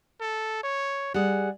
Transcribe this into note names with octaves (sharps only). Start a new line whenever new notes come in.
A4
C#5
G3 G#4 F#5